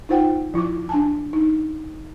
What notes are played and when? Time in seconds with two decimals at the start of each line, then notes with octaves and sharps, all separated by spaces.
0.09 D#4 F4 C5 F#5 G5
0.54 F3 E4 F4 D6
0.89 D4 G#5 A5
1.33 D#4